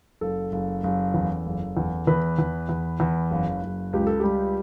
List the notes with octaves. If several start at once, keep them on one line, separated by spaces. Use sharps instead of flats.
F#1 A4
F#1
F#1
E2
F#1
E2
E2 B4
E2
E2
E2
F#1
F#1
C#2 G4
A4
G3 G4